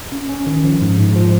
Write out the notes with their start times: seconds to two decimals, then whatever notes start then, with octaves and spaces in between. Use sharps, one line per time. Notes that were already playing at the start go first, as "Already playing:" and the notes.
0.12 C#4
0.29 C#4
0.47 D#3
0.63 F3
0.81 G#2
0.98 G#2
1.16 F3